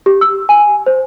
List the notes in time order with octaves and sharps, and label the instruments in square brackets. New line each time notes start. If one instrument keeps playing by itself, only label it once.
[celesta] G4
E6
G#5
C5